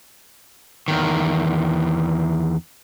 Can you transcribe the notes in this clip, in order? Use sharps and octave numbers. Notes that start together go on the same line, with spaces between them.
E2 D#3